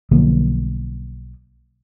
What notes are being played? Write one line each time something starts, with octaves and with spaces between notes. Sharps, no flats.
B1 D3 F3 A#3